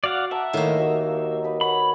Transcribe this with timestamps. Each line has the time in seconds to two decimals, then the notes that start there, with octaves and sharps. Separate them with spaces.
0.04 F#4 D5 F5 F#5
0.31 E5 F#5 A5 A#5
0.53 A2 D#3 A#3 D#5
0.79 D#2 F#4 A#4
1.44 D#4 B4
1.61 C#5 F#5 B5